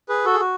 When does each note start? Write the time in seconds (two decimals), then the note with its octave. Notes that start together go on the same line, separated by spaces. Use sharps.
0.09 G#4 B4
0.25 F#4 A4
0.33 G#4
0.40 F#4